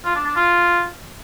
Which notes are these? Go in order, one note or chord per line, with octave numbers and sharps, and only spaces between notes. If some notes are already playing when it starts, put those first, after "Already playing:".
F4
D4
D4
F4